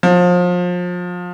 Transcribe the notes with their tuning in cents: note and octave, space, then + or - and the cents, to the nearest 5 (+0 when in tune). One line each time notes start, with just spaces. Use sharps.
F3 +30